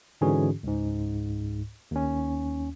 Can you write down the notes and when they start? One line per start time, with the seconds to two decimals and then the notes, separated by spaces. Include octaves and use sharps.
0.21 G#2 D3 E3 C#4 F#4 G#4
0.63 C#2 G#2
1.91 D#2 C#4